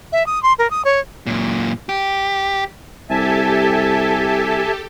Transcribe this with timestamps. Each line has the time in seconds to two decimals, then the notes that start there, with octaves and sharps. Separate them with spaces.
0.12 E5
0.26 D#6
0.43 C6
0.59 A#4
0.71 D#6
0.85 C#5
1.26 F#2 A#2
1.89 G4
3.10 C2 G4 A4 E5 G#5 A5